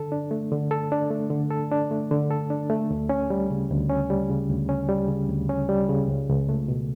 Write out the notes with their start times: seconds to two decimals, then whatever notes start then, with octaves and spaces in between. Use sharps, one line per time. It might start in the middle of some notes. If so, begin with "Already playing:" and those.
Already playing: D3 A4
0.12 D4
0.31 A3
0.52 D3
0.71 A4
0.92 D4
1.11 A3
1.30 D3
1.51 A4
1.71 D4
1.91 A3
2.11 D3
2.30 A4
2.50 D4
2.70 A3
2.90 D2
3.09 C#4
3.30 G3
3.50 C#3
3.70 D2
3.89 C#4
4.10 G3
4.30 C#3
4.50 D2
4.69 C#4
4.89 G3
5.08 C#3
5.29 D2
5.49 C#4
5.69 G3
5.89 C#3
6.08 C#2
6.29 C#2
6.49 A3
6.68 B2